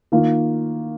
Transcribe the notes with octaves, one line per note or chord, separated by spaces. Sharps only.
D#3 A#3 F4